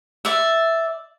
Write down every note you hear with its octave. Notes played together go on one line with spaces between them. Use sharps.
D5 E5